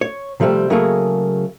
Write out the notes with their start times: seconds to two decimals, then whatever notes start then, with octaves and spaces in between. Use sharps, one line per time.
0.01 C#5
0.40 C3 F3 G3 A3 C4
0.70 C#3 F#3 A3 A#3 G#4